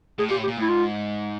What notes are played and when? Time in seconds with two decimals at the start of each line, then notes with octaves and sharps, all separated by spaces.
0.18 A2 G#4
0.28 A#2 G4
0.38 A2
0.43 G4
0.47 A#2
0.57 A2 E4
0.68 G#2 F4